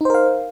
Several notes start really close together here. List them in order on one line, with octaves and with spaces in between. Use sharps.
D#4 C5 A#4 F5